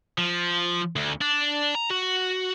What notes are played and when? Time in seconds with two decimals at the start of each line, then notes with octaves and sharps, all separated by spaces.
0.18 F3
0.96 D2
1.21 D4
1.75 A#5
1.90 F#4